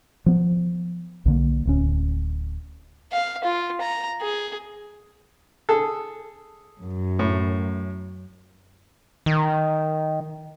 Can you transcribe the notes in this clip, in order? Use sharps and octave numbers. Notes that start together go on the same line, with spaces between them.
F3 B3
B1 D3 A#3
D1 D2 C#4
F5
F4
A#5
G#4
G#4 A4
F#2
A2
D#3